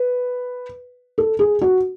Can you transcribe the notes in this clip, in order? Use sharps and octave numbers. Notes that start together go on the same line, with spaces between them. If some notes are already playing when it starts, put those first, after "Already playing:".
Already playing: B4
A4
G#4
F#4